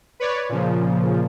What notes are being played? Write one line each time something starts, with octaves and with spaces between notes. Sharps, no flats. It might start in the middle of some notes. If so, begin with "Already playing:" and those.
B4 C#5 D5
A#2 C#3 F3